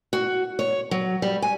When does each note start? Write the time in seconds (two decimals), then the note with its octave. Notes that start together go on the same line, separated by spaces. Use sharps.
0.13 F#4
0.59 C#5
0.91 F#3
1.22 G3
1.42 G#5